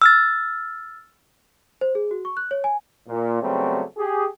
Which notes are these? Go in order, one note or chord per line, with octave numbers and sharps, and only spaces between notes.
E6 F6 A6
C5
G#4
F#4
C#6
F#6
C#5
G#5
A#2
C#3 F#3 G3 A3 B3 C4
G4 G#4